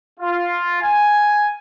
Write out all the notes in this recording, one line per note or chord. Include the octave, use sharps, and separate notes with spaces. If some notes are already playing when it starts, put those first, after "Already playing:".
F4
G#5